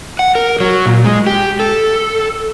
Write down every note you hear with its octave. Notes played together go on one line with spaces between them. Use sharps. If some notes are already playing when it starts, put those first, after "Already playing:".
F#5
A#4
F#3
A#2
G#3
G4
A4